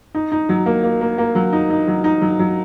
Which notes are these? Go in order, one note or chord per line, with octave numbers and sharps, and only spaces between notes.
D#4
D#4
F#3
A#3
A#3
A#3
A#3
F#3
D#4
D#4
F#3
D#4
F#3
F#3